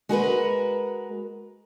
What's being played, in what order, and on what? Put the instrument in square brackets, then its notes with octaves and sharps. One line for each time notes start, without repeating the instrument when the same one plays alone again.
[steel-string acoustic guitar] G#3 F#4 A#4 B4